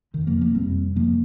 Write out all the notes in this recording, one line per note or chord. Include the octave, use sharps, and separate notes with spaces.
F2 C3 D#3
F3 A#3
F3 A#3
F2 C3 G3 C4
F2 C3 F3 A#3